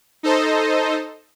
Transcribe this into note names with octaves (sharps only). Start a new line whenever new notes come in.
D#4 A4 C5 D#5